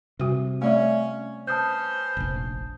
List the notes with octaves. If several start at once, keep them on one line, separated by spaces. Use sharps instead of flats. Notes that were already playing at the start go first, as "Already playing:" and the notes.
C3 G3 F#4
A3 C#4 D5 E5
C#4 B4 C5 A5 D#6 G6
F1 A#1